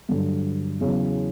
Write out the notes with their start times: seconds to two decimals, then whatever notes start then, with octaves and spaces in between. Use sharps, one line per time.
0.09 G2 D3 F#3
0.81 E2 C#3 F#3